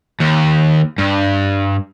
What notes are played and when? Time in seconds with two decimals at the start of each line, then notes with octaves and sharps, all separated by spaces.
0.20 D#2
0.98 G2